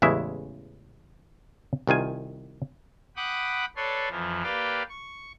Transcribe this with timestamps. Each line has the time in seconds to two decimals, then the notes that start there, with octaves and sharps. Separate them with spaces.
0.02 A1 E2 C#3 G#3 E4 E5
1.87 C2 D#3 F4 G#5
3.16 F#5 G5 B5 D6 D#6 F#6
3.76 A4 B4 C#5 D5 C6
4.09 F2 E3 F3
4.43 A#3 G4 B4 D5 F5 G5
4.89 C#6